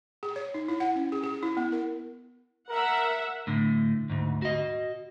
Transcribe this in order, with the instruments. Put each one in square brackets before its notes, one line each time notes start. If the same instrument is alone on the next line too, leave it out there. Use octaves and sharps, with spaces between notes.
[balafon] G#4
C#5
D#4
E4
F#5
C#4
G#4
G#4
E4
B3
A#4
[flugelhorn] A#4 [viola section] E5 F#5
[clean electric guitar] A2 D3
D2 G#2
F#4 D#5